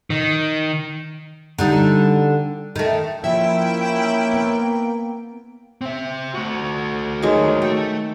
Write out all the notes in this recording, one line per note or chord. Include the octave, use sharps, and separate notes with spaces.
D#3
D3 G3 D#4
D#3 A3
F3 A#3 C#4 E4 E5 G5
B3
C4 E5
A3 F#4
D#3 F#3 G#3
A3 G5